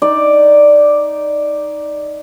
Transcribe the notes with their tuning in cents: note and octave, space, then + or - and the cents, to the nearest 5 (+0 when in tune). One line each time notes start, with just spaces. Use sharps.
D#4 +0 D5 +0